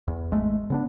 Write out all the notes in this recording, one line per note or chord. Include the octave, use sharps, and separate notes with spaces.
E2
G#1 G#3 A3
C#3 B3 D4